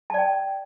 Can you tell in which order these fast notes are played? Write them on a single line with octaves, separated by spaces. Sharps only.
A5 D5 G5